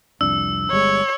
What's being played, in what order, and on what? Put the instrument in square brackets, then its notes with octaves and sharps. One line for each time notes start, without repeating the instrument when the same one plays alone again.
[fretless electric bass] C2 F2 D4 [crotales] E6
[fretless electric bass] G1 G3 G#3 [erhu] C#5